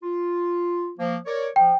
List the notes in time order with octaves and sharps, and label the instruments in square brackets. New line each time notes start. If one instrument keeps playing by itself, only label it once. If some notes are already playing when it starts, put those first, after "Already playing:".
[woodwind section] F4
F3 A#3
A#4 C#5 D5
[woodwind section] F3 [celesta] G5